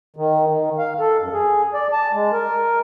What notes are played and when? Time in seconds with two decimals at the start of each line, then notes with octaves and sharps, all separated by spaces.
0.16 D#3
0.48 D#3
0.78 F5
1.00 A4
1.20 F#2
1.33 G#4
1.74 D5
1.93 A5
2.13 G#3
2.32 A#4